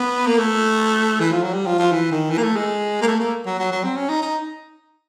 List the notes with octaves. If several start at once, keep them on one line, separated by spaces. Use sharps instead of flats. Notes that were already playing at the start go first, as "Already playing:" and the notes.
Already playing: B3
A#3
A3
E3
F3
F#3
G3
F3
F3
E3
D#3
E3
A#3
A3
G#3
A#3
A3
A#3
F#3
F#3
F#3
C4
C#4
D#4
D#4